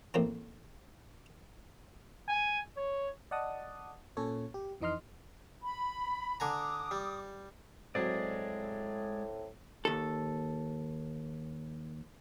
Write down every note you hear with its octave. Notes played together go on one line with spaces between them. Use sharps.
A1 A2 A#3 C4
G#5
C#5
D5 D#5 F#5 A5 D#6
A#2 C#4 A4 C#5
G4
F2 E3 D#4 D#5 C6 F6
B5
D3 G#5 A#5 D6 D#6
G3
A2 F#3 G#3 C4 G#4 D5
D#2 A4